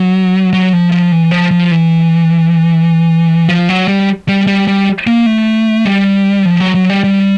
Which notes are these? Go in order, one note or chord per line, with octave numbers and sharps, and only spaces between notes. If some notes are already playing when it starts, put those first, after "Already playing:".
Already playing: F#3
F#3
F3
F3
E3
F3
F3
E3
F3
F#3
G3
G3
G3
G3
A#3
A3
G3
F3
F#3
F#3
G3
G3